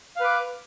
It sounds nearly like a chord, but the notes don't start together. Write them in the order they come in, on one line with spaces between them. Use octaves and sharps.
F5 B4 D6